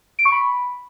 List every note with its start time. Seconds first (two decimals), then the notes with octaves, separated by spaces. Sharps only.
0.19 D7
0.25 C#6
0.32 B5